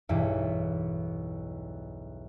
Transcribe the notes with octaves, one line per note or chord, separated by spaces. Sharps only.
B1 E2 G2 E3